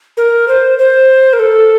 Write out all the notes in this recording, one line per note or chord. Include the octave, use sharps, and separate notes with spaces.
A#4
C5
C5
A#4
A4